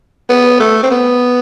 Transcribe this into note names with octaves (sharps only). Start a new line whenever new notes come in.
B3
A3
C4
B3